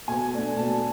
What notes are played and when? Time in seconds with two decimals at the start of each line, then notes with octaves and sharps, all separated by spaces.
0.08 B2 G#5
0.33 A3 D4
0.57 B2 A5